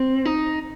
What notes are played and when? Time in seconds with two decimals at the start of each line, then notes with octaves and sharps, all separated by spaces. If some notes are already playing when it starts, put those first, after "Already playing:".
Already playing: C4
0.25 D#4